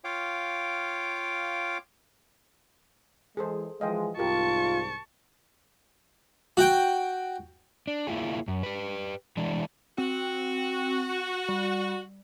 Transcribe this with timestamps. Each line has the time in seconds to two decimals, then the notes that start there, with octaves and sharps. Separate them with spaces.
0.04 F4 C#5 F5 G5 D6
3.37 E3 G#3 G#4 A4 C5
3.81 E3 F3 G#3 D#5 F5 G5
4.19 C2 G#2 F4 G4 A#4 A5 C#6
6.57 F#4 G5
7.87 D4
8.07 A#3 E4 F4 G#4
8.48 F#2
8.63 G4 B4
9.37 E3 G#3 D4
9.98 C4 F#4
11.49 G3